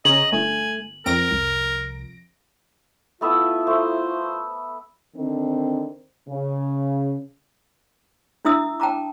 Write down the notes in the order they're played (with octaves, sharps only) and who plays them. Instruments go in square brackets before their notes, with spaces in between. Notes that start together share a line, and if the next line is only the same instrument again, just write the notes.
[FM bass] C#3 [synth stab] C#4 G#4 A#5 [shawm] D#5 [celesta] F#7
[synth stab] G1 [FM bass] A3 [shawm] G#5
[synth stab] F2 A#6 D7 [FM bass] C4 [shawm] A#4
[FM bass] C2
[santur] A3 B3 E5 [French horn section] E4 F4
[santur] A3 [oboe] C5
[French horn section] D3 D#3 C4
C#3
[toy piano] D4 E4 E5 D#6 E6
G5 A5 A#5 D6